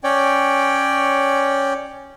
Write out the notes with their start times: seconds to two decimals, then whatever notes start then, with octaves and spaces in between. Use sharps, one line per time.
0.04 C#4 C#5 D5 G5